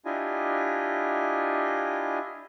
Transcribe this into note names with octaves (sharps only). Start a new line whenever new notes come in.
D4 E4 F4 G4 D#5 G#5